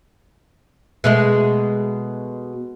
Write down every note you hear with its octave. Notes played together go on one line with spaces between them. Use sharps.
B2 G#3 A3